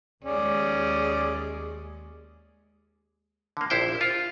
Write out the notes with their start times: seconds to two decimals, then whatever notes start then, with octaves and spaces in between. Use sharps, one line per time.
0.24 D#2 G#3 C#4 G#4 D5
3.57 D3 A#3
3.70 A#1 E4 C5 G5
4.01 F4